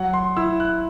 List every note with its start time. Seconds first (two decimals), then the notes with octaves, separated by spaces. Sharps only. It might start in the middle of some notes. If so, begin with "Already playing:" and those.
Already playing: F#3 F#5
0.14 C6
0.37 E4 E6
0.60 F#6